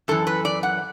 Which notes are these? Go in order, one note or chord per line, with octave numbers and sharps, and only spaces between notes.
F#2 E3 A4
B4
D5
F#5